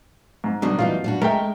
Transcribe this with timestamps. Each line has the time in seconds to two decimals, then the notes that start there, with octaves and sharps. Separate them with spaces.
0.44 G#2
0.62 F#2 B2 D3 G3 D4
0.79 E3 G3 D#4 F4
1.04 G3 D4 F#4
1.22 G#3 A3 A#4 G5